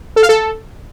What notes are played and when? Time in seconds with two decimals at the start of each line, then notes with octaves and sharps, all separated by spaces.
0.16 A4
0.23 F5
0.29 A4